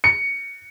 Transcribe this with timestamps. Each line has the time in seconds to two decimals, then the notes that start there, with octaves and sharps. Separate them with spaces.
0.04 C#7